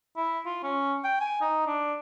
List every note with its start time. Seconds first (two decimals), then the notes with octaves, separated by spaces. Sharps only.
0.16 E4
0.46 F4
0.63 C#4
1.04 G5
1.21 G#5
1.41 D#4
1.67 D4